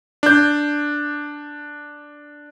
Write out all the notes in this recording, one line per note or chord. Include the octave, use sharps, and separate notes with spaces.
D4 G6